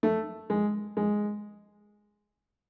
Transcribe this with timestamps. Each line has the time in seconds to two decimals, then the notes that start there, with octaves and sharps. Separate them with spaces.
0.03 A3
0.50 G#3
0.97 G#3